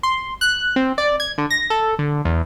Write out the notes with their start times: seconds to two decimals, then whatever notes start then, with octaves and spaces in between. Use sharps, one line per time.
0.03 C6
0.41 F#6
0.76 C4
0.98 D5
1.20 G#6
1.38 D3
1.50 A#6
1.70 A4
1.99 D3
2.25 E2